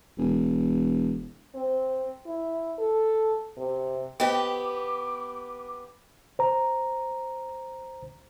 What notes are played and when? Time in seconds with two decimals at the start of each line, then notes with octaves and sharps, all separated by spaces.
0.18 E1
1.55 C4
2.26 E4
2.79 A4
3.58 C3
4.20 B3 G4 C5 D#5 G5 D6
6.39 C5 A#5